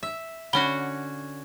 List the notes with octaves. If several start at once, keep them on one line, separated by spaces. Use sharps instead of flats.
E5
D3 C#4 F#4 B5 G7